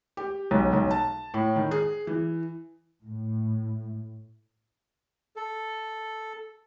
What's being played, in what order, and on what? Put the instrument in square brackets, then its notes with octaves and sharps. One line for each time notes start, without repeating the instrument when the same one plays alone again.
[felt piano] G4
B1
B1
A5
A2
D#3
G#4
E3
[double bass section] A2
[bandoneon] A4